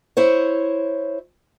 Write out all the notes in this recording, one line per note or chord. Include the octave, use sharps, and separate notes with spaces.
E4 C5 C#5